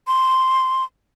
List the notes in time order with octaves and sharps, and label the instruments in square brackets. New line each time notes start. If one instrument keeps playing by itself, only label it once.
[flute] C6